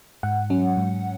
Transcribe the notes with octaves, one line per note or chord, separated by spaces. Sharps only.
G#2 F#5
F#3 C#4
G#2